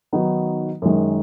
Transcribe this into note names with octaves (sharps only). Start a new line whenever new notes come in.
D#3 F#3 B3 D#4
F#2 D#3 G#3